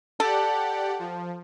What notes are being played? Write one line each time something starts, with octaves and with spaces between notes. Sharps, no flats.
G4 A4 D5 F#5
F3